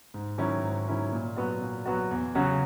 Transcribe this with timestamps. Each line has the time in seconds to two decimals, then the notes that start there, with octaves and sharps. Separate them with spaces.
0.14 G#2
0.38 D#3 F#3 C#4 E4
0.63 G#2
0.88 D#3 F#3 C#4 E4
1.12 A#2
1.37 F#3 B3 F#4
1.61 A#2
1.86 F#3 B3 F#4
2.11 E2
2.35 C#3 F#3 C#4 F#4